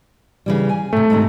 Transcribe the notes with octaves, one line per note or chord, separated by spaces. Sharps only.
C#3 E3 G3
G#5
A2 C3 A3
G#2 C3 D#3